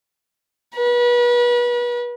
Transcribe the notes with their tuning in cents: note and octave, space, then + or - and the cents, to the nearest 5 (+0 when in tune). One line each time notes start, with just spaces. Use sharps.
B4 -35